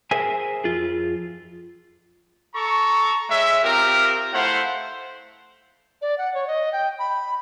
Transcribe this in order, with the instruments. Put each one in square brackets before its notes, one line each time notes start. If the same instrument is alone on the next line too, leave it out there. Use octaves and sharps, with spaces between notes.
[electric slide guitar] G#4 A#4 C5 E5 G#5
F2 F4 G#4
[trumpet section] A4 A#5 C#6
G#3 C#5 E5
C4 F4 G4 A#4
A3 E4 C5 F5 F#5
[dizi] D5
F#5
C#5
D#5
G5
B5